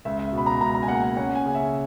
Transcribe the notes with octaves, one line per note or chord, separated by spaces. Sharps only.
C#2 E5
E5
B2
B5
A#5
C#2 A#5
A#5
G#5
A#3 F#5
G#5
C#4 F#5
G#5
C#3
E5